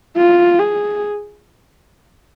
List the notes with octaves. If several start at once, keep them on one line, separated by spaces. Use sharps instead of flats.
F4
G#4